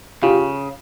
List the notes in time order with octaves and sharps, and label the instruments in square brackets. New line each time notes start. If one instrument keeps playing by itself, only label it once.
[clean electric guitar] C#3 [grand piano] F4 G4